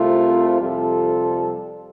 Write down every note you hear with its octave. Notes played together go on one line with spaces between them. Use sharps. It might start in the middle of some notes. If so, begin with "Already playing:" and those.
Already playing: C2 C3 A3 F4
F2 C3 G3 F4 A4